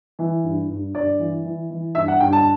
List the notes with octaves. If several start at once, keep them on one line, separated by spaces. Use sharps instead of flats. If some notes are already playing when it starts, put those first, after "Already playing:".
E3
G2
G2
G2 D5
E3
E3
E3
G2 E5
F#5
G2 G5
A5